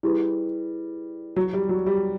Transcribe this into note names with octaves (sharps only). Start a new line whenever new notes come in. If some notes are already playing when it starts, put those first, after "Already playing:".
G3 E4 G#4 B4
F#3
G3
F#3
G3